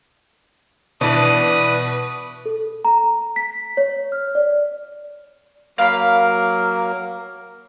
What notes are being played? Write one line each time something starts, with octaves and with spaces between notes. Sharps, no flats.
B2 E3 D4 B4 D#6
A4
A#5
B6
C#5
F6
D5
F#3 A#3 A#4 F5 B5